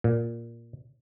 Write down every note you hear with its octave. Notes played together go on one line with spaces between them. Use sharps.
A#2